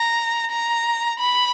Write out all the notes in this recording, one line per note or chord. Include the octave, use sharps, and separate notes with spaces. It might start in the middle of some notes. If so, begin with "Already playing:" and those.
Already playing: A#5
A#5
B5